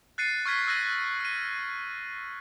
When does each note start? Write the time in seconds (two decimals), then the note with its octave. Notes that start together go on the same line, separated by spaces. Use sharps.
0.18 F#6 A6 C7 C#7 D#7
0.46 C#6 F6 G#6 B6
0.67 E6 F#6 A#6 D#7
1.20 F6 D#7